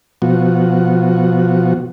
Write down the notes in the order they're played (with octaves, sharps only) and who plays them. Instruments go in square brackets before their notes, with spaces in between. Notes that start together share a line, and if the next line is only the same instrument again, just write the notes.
[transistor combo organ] B2 F3 F#4